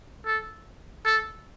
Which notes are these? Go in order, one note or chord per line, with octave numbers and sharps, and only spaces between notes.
A4
A4